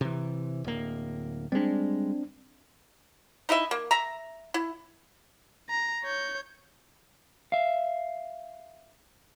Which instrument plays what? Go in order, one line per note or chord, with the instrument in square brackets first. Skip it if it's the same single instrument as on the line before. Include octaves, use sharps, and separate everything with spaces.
[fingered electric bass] C3 E3
D1 A#3
[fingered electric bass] G3 G#3 [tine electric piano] C4 D4
[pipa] D#4 E4 D#5 E5
A#3
E5 A#5
E4
[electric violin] A#5
C#5 G6
[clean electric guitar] E5 F5